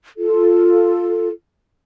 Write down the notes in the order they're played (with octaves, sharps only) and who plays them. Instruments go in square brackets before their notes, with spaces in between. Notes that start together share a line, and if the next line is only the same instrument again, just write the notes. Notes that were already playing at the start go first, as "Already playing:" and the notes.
[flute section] F4 A4